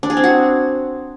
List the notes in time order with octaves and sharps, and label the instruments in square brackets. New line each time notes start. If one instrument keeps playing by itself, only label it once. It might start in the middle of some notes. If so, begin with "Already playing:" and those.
[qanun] D4
G#4
C4
F#4